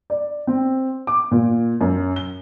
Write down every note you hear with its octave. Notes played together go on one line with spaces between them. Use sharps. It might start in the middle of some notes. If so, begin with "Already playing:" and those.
D5
C4
D6
A#2
F#2
G7